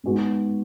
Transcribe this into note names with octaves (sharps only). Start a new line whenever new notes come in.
G#2 G#3 B3 F#4